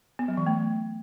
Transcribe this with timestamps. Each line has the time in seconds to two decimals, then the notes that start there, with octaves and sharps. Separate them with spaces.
0.19 B3
0.28 F#3
0.37 E3
0.46 A3